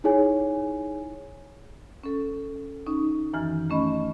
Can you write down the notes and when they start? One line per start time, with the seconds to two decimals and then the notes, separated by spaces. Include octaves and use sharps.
0.04 D#4 E4 G#4 C#5 G#5
2.03 C#4 A4
2.87 C#4 D#4
3.34 F#2 D#3 E3 G#5 F6
3.70 A3 C#4 D#5 B5